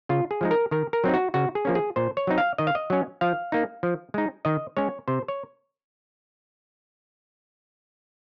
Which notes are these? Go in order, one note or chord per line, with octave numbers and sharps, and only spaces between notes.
C#3 F4
G#4
F3 G#3 D#4
A#4
D#3 A#4
A#4
F#3 C4 D#4
F#4
C#3 F#4
G#4
F3 A#3 C#4
G#4
A#2 C5
C#5
F#3 C4 D#4
F5
D#3 D#5
F5
D#5
F#3 C#4
F3 F5
A#3 D#4
F3
G#3 D#4
D#3 D#5
G#3 C#4 C#5
C3 C5
C#5